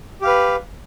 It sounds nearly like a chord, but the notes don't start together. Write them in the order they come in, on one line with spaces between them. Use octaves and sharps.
G4 F5 B4